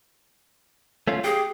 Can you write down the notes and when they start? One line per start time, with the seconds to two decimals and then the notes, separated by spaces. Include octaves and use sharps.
1.07 A3 C#4 F4
1.24 G4 G#4